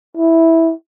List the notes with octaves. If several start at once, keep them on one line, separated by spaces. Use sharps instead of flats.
E4